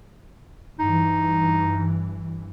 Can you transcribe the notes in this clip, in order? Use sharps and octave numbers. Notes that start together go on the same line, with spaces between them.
G2 E3 D#4